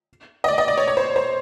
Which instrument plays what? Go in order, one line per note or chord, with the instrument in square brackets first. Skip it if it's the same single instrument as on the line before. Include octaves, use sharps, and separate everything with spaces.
[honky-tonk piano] D#5
D5
D#5
D5
C#5
C#5
C5
C5